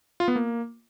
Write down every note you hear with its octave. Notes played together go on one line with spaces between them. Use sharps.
F4
B3
A#3